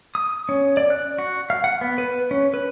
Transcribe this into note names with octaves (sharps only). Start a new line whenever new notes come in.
D#6
C#4
D5
F#6
F#4
F5
F#5
B3
B4
C#4
B4